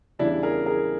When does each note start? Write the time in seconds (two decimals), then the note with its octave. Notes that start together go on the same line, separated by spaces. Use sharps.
0.19 E2 C#3 E3 G3 D4 E4
0.43 G#4 A#4
0.66 G#4 A#4